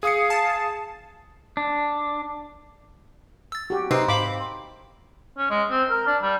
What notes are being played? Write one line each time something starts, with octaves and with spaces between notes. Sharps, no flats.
G#4 F5 D#6 C#7
A5
D4
E6 A6
F#4 G4
C3 C4 D#4 B4 C7
G#2 F5 B5 D6
C#4
G#3
C4
A#4
D4
G3